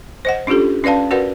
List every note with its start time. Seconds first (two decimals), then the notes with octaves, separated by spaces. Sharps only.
0.25 C5 D#5 F#5
0.47 C#4 D4 F4 G4 A4
0.84 C#4 B4 D5 F5 A5
1.11 F#4 A#4 B4 D5 F#5